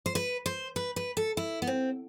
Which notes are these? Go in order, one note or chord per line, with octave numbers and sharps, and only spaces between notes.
C5
B4
C5
B4
B4
A4
E4
B3
C4